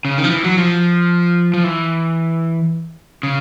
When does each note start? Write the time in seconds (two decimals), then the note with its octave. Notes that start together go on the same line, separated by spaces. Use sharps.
0.05 C#3
0.18 D#3
0.24 F3
0.30 E3
0.44 F#3
0.58 F3
1.54 F3
1.64 E3
3.23 C#3